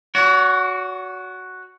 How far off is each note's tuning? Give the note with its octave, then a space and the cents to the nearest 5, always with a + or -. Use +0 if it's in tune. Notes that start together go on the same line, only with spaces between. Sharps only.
F#4 +0 C#5 +45